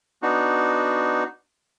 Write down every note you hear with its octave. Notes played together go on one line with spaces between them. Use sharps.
B3 D4 D#4 F#4